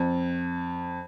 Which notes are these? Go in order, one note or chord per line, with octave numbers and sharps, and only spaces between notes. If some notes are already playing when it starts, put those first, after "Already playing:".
Already playing: F2